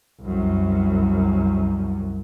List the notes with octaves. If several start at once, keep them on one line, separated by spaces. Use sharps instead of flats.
C2 F#2